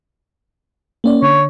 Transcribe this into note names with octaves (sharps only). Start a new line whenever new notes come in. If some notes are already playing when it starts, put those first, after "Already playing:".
A#3 C#4 D5
D3 C#5